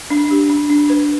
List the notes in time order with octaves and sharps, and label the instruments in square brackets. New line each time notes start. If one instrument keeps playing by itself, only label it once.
[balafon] D4
G4
D4
D4
B4